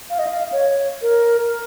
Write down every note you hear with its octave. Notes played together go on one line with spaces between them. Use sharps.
F5
D#5
F5
C#5
A#4